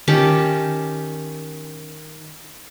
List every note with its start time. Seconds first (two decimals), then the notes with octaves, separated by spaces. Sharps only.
0.08 D#3 C#4 G4 A5